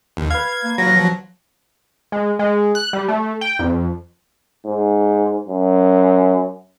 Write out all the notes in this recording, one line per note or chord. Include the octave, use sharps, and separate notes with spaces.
D#2
B4 F5 G#6
A#3
F#3 A#6
F3
G#3
G#3
F#6
G3
A3
G5
F2
G#2
F#2